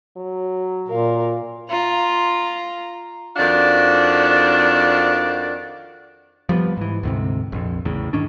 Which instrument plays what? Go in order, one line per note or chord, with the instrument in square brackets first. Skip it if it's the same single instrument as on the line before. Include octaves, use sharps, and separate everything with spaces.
[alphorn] F#3
[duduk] A#2 [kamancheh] A#4 F5
[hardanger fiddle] F4 [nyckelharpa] A#5
[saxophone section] F2 D#3 D4 F#4 D5 F5
[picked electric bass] F3 G3 G#3 B3
G#2 E3
D2 G#2 C3
A#1 F2
E2 A2 C#3
G#2 D#3 C#4 D4